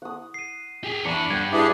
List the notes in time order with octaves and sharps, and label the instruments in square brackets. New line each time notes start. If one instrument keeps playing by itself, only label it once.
[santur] F#5 D#6
[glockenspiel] C7 D#7
[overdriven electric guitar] G4 G#4
[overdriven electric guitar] E2 E4 [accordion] D4 [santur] A#5 C#6 D6 [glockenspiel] C#7 D#7
[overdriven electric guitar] G2 [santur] F#5 G5 [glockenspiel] G6 G#6
[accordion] D4 G4 G#4 [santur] E4 B4 D5 [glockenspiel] D6